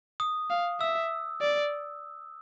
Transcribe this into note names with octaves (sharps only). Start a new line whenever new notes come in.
D#6
F5
E5 E6
D5